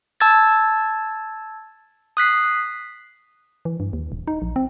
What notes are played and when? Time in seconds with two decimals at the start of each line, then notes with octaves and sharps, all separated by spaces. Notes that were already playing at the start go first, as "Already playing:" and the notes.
0.21 A5 E6 G#6 A6
2.17 D#6 F#6 B6 C7
3.65 E3
3.80 G2
3.93 D#2
4.12 D#1
4.27 D#4
4.42 A#1
4.56 C4